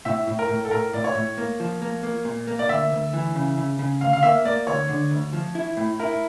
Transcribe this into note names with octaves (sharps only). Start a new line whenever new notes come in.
A2 E5
A2
A#4
A2
A4
A2 A#4
A2 D5
C#5
A2
A#3
F3
A#3
A#3
A#2
A#3
D5
D2 E5
D2
E3
C#3
C#3
C#3
D2 F5
F5
A#3 E5
A#3 D5
D2 C#5
D3
D2
F3
E4
A2
E4 A#4